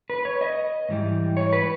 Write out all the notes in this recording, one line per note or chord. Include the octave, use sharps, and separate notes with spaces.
B4
C#5
D#5
G#2 E3 G3
C#5
B4